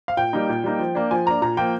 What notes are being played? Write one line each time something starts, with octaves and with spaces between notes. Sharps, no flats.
F5
A#2 G5
G3 A#3 D#4
A#2
G3 A#3 D#4
F3
A#3 D4
F3 G#5
A#3 D4 A#5
A#2 A#5
F3 A#3 G5